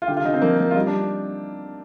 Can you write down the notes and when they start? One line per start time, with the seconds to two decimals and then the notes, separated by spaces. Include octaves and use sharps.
0.02 F4
0.08 D3 G4
0.17 F4
0.25 D3 D#4
0.34 C4
0.42 F3 A#3
0.59 A#3
0.71 F4
0.76 G3 D#4
0.87 D4